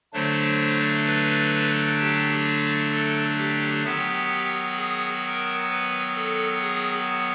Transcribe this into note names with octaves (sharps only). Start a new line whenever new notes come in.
D3 F#3 A3 D4 C5
B4
G4
A4
G4
D#3 F#3 B3 G4
G#4
A#4
B4
A4
G#4